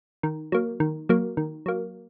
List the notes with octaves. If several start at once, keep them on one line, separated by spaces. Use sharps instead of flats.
D#3
F#3 A#3
D#3
F#3 A#3
D#3
F#3 A#3